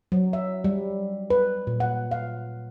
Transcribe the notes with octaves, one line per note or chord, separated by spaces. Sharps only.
F#3
E5
G3
B4
A#2
F#5
F5